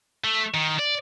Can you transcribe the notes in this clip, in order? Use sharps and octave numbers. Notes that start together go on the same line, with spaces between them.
A3
D#3
D5